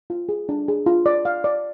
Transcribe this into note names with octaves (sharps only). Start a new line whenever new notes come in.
F4
G#4
D4
G#4
F4
D5
F5
D5